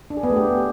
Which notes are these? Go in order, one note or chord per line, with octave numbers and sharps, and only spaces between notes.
D4
G#4
B3
A3
G4